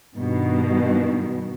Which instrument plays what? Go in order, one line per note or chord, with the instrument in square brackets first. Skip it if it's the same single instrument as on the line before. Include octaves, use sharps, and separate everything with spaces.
[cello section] G2 B2 D#3